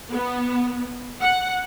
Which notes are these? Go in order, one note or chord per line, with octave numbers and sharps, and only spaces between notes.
B3
F#5